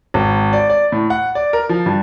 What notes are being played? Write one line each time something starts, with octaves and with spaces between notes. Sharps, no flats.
G#1
D5
D5
A2
F#5
D5
A#4
F3
G2